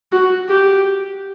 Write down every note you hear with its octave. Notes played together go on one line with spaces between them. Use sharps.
F#4
G4